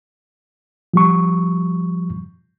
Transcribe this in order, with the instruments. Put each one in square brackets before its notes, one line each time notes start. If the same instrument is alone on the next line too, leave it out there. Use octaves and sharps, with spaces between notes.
[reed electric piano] F3 G3 C#6